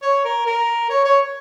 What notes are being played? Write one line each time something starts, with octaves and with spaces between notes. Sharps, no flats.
C#5
A#4
A#4
C#5
C#5